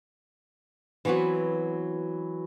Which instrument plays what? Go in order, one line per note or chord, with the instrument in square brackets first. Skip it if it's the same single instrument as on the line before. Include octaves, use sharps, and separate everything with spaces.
[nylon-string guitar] E3 F#3 B3 C4 F#4